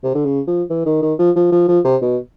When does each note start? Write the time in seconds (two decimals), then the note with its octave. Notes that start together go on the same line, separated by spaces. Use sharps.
0.03 C3
0.14 D3
0.25 C#3
0.47 F3
0.70 E3
0.86 D#3
1.02 D#3
1.19 F3
1.36 F3
1.52 F3
1.68 F3
1.85 C3
2.02 B2